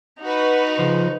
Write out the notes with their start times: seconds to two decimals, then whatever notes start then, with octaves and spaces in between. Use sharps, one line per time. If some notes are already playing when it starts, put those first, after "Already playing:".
0.21 D#4 F#4 B4
0.79 C#3 F3